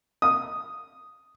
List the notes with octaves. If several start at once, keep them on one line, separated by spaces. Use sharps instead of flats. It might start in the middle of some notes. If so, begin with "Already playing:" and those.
D#6